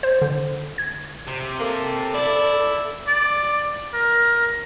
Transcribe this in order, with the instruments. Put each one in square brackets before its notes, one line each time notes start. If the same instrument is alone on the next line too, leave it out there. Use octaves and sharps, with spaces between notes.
[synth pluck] C5
D3
G#6
[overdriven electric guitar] C3
[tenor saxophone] A#3 [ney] A4
[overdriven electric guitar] E4 [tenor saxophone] D5
[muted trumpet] D5
A#4